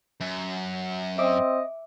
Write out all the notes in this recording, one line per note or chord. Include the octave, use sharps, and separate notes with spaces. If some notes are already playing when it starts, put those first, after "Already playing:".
F#2
C4 D#5 E5 D6